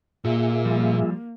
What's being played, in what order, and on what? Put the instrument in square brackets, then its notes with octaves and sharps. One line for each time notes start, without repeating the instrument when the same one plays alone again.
[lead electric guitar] A#2 [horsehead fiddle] A#3 [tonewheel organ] F4 G#4 E5
[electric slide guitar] F3 G3